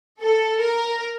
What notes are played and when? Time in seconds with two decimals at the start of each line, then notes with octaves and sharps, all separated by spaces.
0.20 A4
0.59 A#4